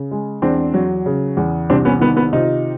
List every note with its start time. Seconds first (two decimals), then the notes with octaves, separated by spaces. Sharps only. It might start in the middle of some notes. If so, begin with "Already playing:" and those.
Already playing: C#3
0.11 G#3
0.42 E2 C4 D4
0.74 F#3
1.06 C#3
1.37 E2
1.70 C2 C4 D4
1.85 B3 C#4
2.00 D#3 B3
2.17 B3
2.33 C3 D#4 F4